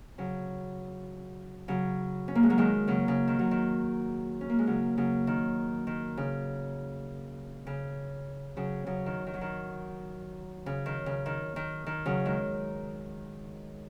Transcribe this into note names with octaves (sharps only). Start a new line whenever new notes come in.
C#3 F#3
C#3 F#3
C#4
A#3
G#3
F#3 A#3
D#3 G#3
C#3 F#3
C#3
D#3
F#3
D#3
C#4
A#3
G#3
C#3 F#3
C#3 F#3
D#3
D#3
C#3
C#3
C#3 F#3
C#3 F#3
D#3
D#3
F#3
D#3
C#3
D#3
C#3
D#3
D#3
D#3
C#3 F#3
D#3 G#3